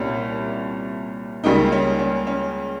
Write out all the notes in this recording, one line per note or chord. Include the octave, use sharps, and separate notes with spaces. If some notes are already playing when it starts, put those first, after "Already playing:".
Already playing: C2 A#2 G3 C#4
C#2 C#3 G3 A#3 D#4
C#4
C#4
C#4